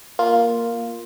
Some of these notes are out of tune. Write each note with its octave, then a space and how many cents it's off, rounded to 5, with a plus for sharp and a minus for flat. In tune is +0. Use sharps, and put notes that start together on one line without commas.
A#3 +0 F4 +0